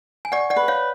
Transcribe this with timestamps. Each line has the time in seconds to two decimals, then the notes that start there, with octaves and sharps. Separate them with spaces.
0.25 G#5
0.32 D5 F#5 C#6
0.50 D5 F#5
0.56 B4
0.68 C#5 F5